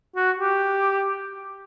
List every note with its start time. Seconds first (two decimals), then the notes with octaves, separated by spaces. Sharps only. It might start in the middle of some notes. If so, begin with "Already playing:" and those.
0.15 F#4
0.39 G4